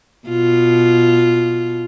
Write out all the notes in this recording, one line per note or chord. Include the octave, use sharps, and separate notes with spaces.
B2 F4